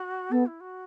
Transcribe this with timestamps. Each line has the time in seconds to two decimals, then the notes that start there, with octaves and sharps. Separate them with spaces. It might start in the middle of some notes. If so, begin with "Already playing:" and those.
Already playing: F#4
0.31 B3 A4
0.45 E4
0.60 F#4